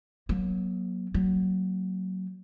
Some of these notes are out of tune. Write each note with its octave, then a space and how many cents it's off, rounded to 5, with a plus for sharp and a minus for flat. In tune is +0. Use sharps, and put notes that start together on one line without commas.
F#3 +0 A#3 +35
F#3 +10 A#3 -15